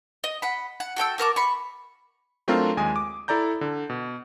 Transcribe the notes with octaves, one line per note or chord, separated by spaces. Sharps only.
D#5
F#5 B5
F#5
F#4 A4 G5 E6
F#4 A#4 A5 D6
B5 C#6
F#3 A3 C4 D4 F4 A#4
D#2 G#3 G#5 D#6
D6
E4 A4 D5 A#5 G6
D3
B2